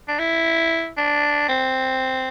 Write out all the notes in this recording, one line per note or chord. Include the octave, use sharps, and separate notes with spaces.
D4
E4
D4
C4